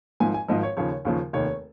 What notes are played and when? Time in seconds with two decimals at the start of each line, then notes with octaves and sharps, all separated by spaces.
0.20 G#1 G#2 F3 G#5
0.34 G#5
0.48 G#1 G#2 F3 D#5
0.63 C#5
0.77 D#2 C#3 F3 C#5
1.05 D#2 C#3 F3
1.33 F1 D#2 D#3 C#5